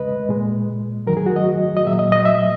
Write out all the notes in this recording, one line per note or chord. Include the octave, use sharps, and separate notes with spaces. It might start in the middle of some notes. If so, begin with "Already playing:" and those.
Already playing: E2 C#3 G#3 B4 D#5
A#2 G#3
F#2 D#3 F#3 A#4
G#4
F#4
D#5
D#5
A#2 F#3 E5
D#5
D#5
E5